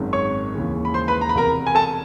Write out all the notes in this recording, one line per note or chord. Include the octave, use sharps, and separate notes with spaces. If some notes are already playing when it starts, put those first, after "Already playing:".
Already playing: G#1 F#2 D#3 G#3
C#5 C#6
D#2 C#3 E3 G#3
B5
C5 C6
B4 B5
A#5
B5
E1 E2 C3 A#4 A#5
G#5
A4 A5